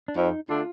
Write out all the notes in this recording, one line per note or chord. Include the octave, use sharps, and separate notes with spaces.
D4
F2 D#4
D3 A3 D4 F4